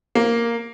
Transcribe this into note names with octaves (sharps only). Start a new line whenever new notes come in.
A#3